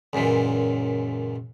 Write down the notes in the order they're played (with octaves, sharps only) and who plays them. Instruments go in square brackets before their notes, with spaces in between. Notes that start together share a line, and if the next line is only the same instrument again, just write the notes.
[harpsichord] C#2 F#2 A#2 E3